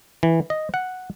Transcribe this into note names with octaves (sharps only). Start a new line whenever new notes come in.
E3
D#5
F#5